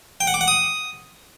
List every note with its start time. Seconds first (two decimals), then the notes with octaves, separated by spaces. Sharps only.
0.21 G5
0.27 F#5
0.34 D6
0.41 F#5
0.48 D#6